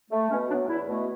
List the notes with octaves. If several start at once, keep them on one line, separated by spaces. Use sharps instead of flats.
A3
B2 C#4
F#3 B3 D4
E2 E4
B2 A3